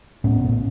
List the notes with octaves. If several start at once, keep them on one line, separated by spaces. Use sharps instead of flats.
A2 B3 C#4
A2